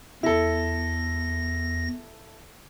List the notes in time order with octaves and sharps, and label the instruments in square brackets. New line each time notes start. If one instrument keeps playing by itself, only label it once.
[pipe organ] E2 A#6 [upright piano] E4 A4